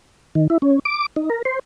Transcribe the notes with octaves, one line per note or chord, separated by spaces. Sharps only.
D#3
E4
C#4
D6
D#4
A#4
C5